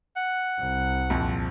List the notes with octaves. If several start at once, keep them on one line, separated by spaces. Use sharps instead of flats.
F#5
C2
A#1 F2